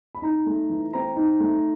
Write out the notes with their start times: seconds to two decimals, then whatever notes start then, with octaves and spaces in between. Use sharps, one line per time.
0.15 B5
0.22 D#4 A#5
0.46 A3
0.70 E3
0.93 C4 A#5
1.16 D#4
1.40 A3